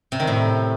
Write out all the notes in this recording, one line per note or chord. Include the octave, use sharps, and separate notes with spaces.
C3
D#3
A2